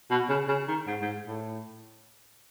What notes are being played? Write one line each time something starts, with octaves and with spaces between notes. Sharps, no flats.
B2
C#3
C#3
D#3
G#2
G#2
A2